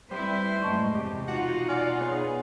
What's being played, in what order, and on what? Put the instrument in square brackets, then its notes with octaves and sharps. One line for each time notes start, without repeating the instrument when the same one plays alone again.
[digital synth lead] G3 [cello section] C4 E4 B4 [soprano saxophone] C5
[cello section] F#2 A2 G#3 [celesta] D#5 A5 C#6
[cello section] E2 C3 [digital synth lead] G4
[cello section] B2 D#4 F4 [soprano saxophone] F#4 [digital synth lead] F#5
[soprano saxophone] D5 [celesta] G#5 F6
[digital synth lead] B3 [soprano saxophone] G#4 [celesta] C#5 B5